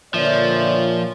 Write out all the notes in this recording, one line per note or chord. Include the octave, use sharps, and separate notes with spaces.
A#2 D3 F3 C#5 D5 E5